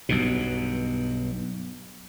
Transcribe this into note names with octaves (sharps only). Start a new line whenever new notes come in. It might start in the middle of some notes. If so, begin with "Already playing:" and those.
B1 G2 B2